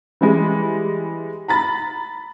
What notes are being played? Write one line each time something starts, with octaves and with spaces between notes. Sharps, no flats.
E3 G3 G#3
A#5 B5 A6